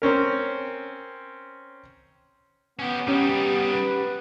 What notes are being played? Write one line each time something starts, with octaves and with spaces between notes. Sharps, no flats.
C4 C#4 A#4
B3 C#4 G4
G3 B3 C#4 D#4 G4
B4